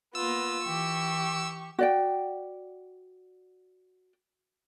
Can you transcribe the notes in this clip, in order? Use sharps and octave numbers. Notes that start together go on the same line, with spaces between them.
A#3 B3 F4 E6
E3 G4 C#6
F#4 D5 G5